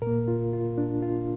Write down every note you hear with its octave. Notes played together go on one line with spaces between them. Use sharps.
A#2 A#4
A#3
F4
F4
D4
F4